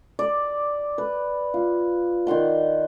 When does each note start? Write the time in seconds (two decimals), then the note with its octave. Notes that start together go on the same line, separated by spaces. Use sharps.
0.19 D5
0.98 B4
1.54 F4
2.27 D#3 D5 F#5 C6